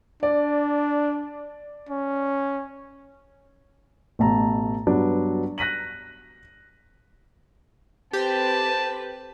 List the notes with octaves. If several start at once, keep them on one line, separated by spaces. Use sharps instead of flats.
D4 D5
C#4
A1 B2 A3 A5 A#5
G2 F#3 B3 D4
F#6 A#6 B6 D#7 F#7
C4 G4 A4 B4 A5